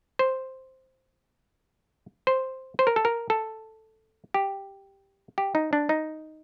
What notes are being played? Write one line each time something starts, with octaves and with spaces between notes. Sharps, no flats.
C5
C5
C5
A#4
A4
A#4
A4
G4
G4
D#4
D4
D#4